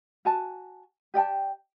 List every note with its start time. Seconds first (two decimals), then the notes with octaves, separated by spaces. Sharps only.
0.25 F#4 G#5 A5
1.14 G4 D5 G5 A5